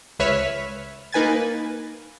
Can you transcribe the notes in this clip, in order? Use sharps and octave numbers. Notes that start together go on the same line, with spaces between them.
C#2 B4 C#5 E5 F6 B6
A#3 D#4 B4 G#5 G#6 A6